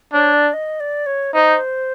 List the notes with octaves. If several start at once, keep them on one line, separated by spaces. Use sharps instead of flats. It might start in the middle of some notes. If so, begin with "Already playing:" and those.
D4 C#5
D5
D#5
D5
C#5
D#4 C5